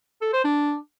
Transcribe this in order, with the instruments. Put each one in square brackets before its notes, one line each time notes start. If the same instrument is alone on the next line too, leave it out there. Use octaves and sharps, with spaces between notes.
[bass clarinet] A4
C5
D4